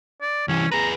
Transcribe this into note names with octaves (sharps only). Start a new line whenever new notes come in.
D5
C2 E3 C#4
G#4 B4 A#5